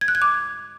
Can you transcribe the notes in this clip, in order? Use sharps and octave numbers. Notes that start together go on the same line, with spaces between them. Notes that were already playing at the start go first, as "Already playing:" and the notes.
G#6
F#6
G#6
D6